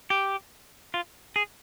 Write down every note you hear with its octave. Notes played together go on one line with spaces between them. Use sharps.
G4
F4
G#4